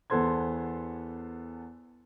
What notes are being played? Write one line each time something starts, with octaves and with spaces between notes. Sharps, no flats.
E2 B3 A4 C5 C6 G#6